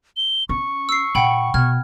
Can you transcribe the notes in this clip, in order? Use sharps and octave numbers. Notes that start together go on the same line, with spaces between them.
G7
C#4 C#6
E6 C7
A#2 F#5 G5 B5
B2 F6 G#6